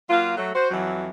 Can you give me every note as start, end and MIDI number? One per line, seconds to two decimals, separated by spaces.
0.10 0.36 54
0.10 0.36 58
0.10 0.36 65
0.37 0.51 54
0.37 0.51 57
0.55 0.69 66
0.55 0.69 72
0.71 1.10 41
0.71 1.10 52
0.71 1.10 54